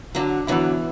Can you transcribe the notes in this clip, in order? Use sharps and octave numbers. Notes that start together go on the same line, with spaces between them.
D3 F#3
D3 E3 F#3 B3 E4